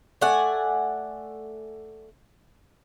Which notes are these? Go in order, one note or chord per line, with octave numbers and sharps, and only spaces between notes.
A3 D5 F#5 G#5